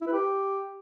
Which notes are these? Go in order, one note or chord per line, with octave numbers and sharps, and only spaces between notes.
E4
B4
G4